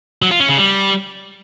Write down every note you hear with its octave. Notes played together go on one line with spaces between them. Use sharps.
F#3
F4
C#4
C#3
G3